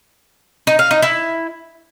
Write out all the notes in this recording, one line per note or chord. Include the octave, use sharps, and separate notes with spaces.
D#4
F5
D#4
E4